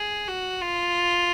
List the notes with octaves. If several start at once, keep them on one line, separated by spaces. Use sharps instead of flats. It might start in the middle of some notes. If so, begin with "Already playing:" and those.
Already playing: G#4
F#4
F4